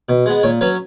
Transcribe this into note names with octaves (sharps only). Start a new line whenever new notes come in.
B2
G#3 B3
A#2 C#5
F#3 C#4 B4